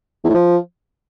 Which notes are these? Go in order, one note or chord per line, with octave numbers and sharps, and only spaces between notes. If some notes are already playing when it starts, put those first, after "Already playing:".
E2
A2
F3